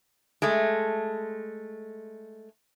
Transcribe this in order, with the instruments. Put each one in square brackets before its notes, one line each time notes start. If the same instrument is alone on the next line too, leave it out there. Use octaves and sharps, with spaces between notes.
[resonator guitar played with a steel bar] G#3 A3